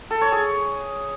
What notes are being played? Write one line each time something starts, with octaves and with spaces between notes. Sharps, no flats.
A4
C#5
G#4